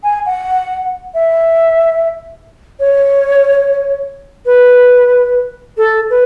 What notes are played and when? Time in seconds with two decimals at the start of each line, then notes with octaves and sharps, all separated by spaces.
0.03 G#5
0.26 F#5
1.14 E5
2.80 C#5
4.46 B4
5.77 A4
6.10 B4